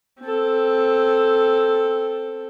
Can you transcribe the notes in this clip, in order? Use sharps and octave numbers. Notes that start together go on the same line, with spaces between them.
C4 A4